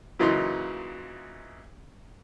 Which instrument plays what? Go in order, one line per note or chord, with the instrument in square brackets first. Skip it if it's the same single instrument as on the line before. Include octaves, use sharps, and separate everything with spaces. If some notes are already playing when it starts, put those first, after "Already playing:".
[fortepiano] A#2 C#3 E3 F#3 D#4 C6